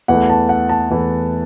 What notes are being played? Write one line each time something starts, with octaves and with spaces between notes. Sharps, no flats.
E2 E3 A3 F#5
A5
F#5
A5
E2 E3 A3